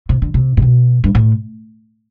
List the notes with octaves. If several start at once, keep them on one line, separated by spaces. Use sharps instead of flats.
C3
D3
C3
A2
B2
G2
A2